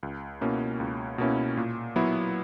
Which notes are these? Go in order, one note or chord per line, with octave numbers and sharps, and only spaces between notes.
C#2
B2 A#3 C#4 E4
C#2
B2 A#3 C#4 E4
A#2
F#3 B3 E4